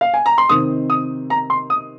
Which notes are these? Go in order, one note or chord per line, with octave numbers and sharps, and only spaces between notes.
F5
G#5
A#5
C6
C3 D#3 C4 D#4 D#6
D#6
A#5
C6
D#6